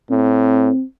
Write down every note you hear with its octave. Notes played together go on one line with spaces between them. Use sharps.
A2 C4